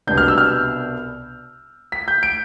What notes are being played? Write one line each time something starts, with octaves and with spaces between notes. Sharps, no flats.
C2 B2 G3 B3 D4 G6
F6
E6
F6
B6
G6
D7